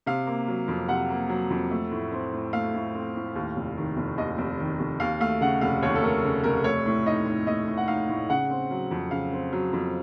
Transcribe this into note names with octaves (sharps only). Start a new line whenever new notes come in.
C3 F5
A#3
F#3
F2
C3 F#5
A#3
F#3
F2
A3
A2
C4
A2
A3 F5
A2
C4
A2
D#2
F1
D#3
F1
D#2 D#5
F1
D#3
F1
D#2 F5
A3 F5
C#3 F#5
F1 F5
D#2 C#5
A4
A3 A#4
C#3
F1 A#4
A3 C#5
A2
D#4 D#5
A2
A3 D#5
A2
F#5
D#4 F5
A2
C#3 F#5
C4
F#3
F2
C#3 F5
C4
F#3
F2